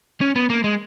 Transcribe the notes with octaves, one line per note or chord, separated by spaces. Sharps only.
C#4
B3
A#3
G#3